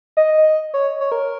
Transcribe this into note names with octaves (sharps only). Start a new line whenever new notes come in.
D#5
C#5
C#5
A#4